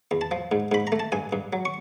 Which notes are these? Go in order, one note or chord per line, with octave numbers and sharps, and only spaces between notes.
E2
A5
F3
G#2
G#2 B5
A#5
A3
A5
G2 G#5
G2
F#3
C#6